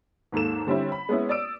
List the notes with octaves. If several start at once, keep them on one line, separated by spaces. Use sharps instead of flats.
D#2 G#2 A#3 A4 E7
D3 G3 C4 C#4 E4
B5
G#3 B3 C#4 E4
D5 D#6 E6 D7